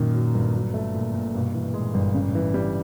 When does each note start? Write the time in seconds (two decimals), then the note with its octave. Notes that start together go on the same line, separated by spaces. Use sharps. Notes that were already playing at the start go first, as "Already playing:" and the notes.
Already playing: F#2 A#2 D#3
0.14 F#3
0.34 G1
0.55 F#3
0.74 A3
0.94 A#2
1.14 A#2
1.34 G2 B2
1.55 E3
1.74 A#2 G#3
1.94 G1
2.14 A2 C#3
2.35 E3
2.54 G3